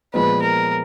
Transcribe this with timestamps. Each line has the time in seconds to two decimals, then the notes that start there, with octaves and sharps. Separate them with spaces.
0.14 A#2 F3 G#3 B3 B4
0.42 A#4